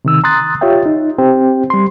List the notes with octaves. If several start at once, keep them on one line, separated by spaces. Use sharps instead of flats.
C3 D#3 E6
A#5 C6 D#6 F#6 A6
F4 G4 C#5 E5 G5
D#4
C4 G4 C5 G5
G3 C6